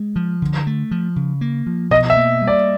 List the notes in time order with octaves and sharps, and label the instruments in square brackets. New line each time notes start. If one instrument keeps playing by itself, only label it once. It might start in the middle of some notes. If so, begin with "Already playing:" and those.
Already playing: [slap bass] G#3
F3
D3
A3
F3
C#3
A#3
F3
[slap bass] B2 [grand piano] D#5
[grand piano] E5
[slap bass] A#3
G3
[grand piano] D5